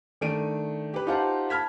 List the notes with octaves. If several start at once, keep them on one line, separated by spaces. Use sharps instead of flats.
D#3 A3 D4 D7 D#7
G4 B4
D#4 F4 G4 C5 F#5 A5
A5 B5 F6 G#6 B6